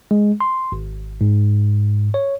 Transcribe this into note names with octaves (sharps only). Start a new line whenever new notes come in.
G#3
C6
G#1
G#2
C#5